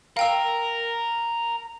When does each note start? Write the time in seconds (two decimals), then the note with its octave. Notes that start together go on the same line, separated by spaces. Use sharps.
0.17 A#4 F5 G5 E6